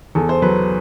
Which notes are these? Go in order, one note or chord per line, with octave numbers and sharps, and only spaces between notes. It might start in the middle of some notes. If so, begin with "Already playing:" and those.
E2 A4
C5
F#3 B4